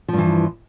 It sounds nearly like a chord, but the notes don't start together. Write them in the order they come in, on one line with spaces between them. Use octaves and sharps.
F3 G2 E3